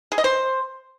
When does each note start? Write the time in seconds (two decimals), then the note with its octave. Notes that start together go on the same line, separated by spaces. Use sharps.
0.12 G#4
0.18 D#5
0.24 C5